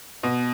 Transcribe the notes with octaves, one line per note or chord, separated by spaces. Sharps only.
B2